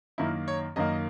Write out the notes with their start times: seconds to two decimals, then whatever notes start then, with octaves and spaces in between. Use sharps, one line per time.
0.18 F#2 D#3 A#3 E4
0.48 C#5
0.76 F#2 D#3 A#3 D#5